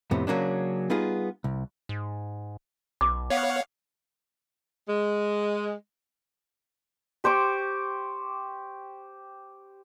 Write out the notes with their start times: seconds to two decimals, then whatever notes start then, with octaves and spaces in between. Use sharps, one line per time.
0.11 F2 A2 C3 B3
0.27 C#3 F#3 A#3 C#4 D4
0.90 G3 B3 D#4 F4 G#4
1.44 C2
1.89 G#2
3.01 B1 D6
3.30 B3 C#5 F5 F#5
4.88 G#3
7.24 G4 C5 C#6 D6